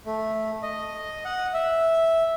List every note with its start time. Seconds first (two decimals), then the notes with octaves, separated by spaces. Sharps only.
0.06 A3
0.63 D#5
1.25 F#5
1.54 E5